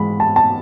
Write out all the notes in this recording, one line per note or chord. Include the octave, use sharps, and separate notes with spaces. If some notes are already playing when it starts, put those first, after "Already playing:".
Already playing: G#2 E3 G#3 B5
A5
A5